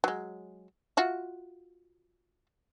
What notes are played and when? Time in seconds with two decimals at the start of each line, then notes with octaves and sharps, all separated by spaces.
0.04 F#3 G#3
0.97 F4 F#4 E5